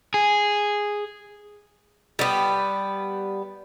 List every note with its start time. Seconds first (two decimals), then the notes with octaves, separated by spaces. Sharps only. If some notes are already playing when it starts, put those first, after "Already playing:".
0.14 G#4
2.19 G3 B3